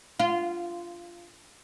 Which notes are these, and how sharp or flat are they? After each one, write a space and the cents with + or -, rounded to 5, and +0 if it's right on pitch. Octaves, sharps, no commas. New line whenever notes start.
F4 -15